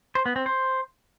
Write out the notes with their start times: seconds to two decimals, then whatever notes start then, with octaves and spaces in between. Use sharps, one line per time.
0.15 C5
0.26 B3
0.36 C4
0.46 C5